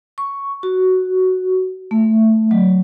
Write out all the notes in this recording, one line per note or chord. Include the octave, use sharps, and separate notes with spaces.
C#6
F#4
A3
F#3